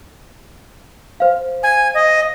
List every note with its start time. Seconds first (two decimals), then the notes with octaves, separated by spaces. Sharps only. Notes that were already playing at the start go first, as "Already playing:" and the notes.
1.20 C5 F5
1.63 G#5
1.94 D#5